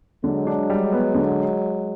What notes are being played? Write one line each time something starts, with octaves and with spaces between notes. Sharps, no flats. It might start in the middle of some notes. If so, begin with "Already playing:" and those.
D3 F#3 G#3
D4
G3
B3
D3